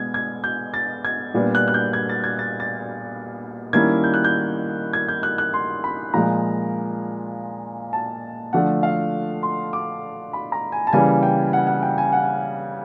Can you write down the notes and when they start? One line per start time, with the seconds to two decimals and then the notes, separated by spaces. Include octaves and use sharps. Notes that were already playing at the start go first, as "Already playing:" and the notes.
Already playing: B2 G#3 G#6
0.14 G#6
0.44 G6
0.74 A6
1.05 G#6
1.34 A#2 G3 B3 D4
1.55 F#6
1.68 F#6
1.74 G6
1.93 G#6
2.09 A6
2.24 G#6
2.39 A6
2.60 A6
3.73 D#3 G3 A#3 C#4 E4 G#6
4.04 G6
4.14 F#6
4.25 G6
4.93 G#6
5.08 G6
5.23 F#6
5.38 F#6
5.54 C6
5.84 B5
6.14 A#2 F3 G#3 A#5
7.93 A5
8.53 D3 F3 A3 D4 F#5
8.83 F5
9.43 C6
9.73 D6
10.33 B5
10.52 A#5
10.72 G#5
10.87 A5
10.93 C#3 E3 G3 A#3 G#5
11.23 G5
11.53 F#5
11.67 F#5
11.83 G5
11.98 G#5
12.13 F#5